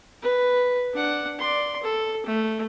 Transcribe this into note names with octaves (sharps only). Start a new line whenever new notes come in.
B4
D4 F#5
D5 C6
A4
A3